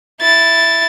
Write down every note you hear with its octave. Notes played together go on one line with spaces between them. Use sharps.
E4 A6